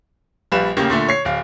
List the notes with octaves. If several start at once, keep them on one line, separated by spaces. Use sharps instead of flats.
A#1 G3 B4 F5 E7
A2 C#3 A#3 G4
A#2 D3 A3
C#5 C7
D1 F5